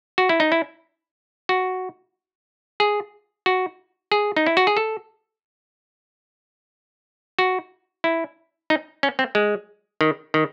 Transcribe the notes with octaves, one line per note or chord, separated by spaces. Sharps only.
F#4
E4
D#4
E4
F#4
G#4
F#4
G#4
D#4
E4
F#4
G#4
A4
F#4
E4
D#4
C#4
C4
G#3
D#3
D#3